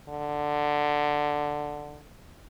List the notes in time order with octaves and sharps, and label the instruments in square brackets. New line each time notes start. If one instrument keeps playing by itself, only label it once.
[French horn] D3